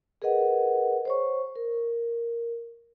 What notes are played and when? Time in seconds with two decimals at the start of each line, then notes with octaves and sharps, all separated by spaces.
0.22 G#4 A#4 B4 D#5 F#5
1.05 C5 C#5 C#6
1.55 A#4